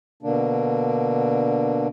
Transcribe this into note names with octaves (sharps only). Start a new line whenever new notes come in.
B2 D3 A#3 D4